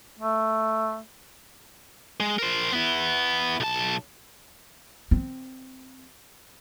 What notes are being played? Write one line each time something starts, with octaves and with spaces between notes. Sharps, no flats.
A3
G#3
A#4 C5
B3 E4
B1 A5
C4